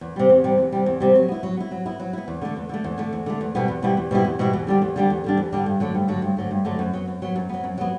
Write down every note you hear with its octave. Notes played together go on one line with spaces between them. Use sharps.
E2
C3 G3
E2
C3 G3
E2
C3 G3
E2
C3 G3
F#3
B3 E4
F#3
B3 E4
F#3
B3 E4
F#3
B3 E4
E2
D3 A3
E2
D3 A3
E2
D3 A3
E2
D3 A3
E2
B2 G3 B3 E4
E2
B2 G3 B3 E4
E2
B2 G3 B3 E4
E2
B2 G3 B3 E4
E2
D3 G3 D4
E2
D3 G3 D4
E2
D3 G3 D4
E2
D3 G3 D4
G2
D3 F#3 A3
G2
D3 F#3 A3
G2
D3 F#3 A3
G2
D3 F#3 A3
F#2
F#3 B3
F#2
F#3 B3
F#2
F#3 B3
F#2
F#3 B3